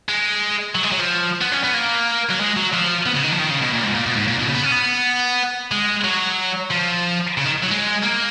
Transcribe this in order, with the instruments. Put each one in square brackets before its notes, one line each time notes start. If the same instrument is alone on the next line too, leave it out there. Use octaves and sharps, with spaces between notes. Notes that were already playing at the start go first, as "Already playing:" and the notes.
[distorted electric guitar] G#3
F#3
G#3
F#3
F3
B3
C#4
B3
A#3
F#3
G#3
F#3
F3
B3
C#3
D#3
F3
D#3
C#3
B2
A#2
G#2
A#2
B2
G#2
A#2
B2
C#3
B3
C#4
B3
G#3
F#3
F3
C#3
D#3
F#3
G#3
A#3